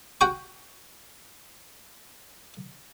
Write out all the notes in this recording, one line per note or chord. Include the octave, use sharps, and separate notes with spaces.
F#4 G5 C#6